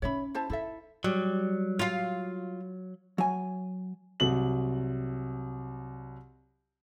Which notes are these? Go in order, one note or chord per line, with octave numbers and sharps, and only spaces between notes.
C#4 D#4 C#5 E5 B5
E4 C5 A5
D#4 E4 A4 E5
F#3 G3
F4 F5
F#3 G#5
C2 F#3 F#7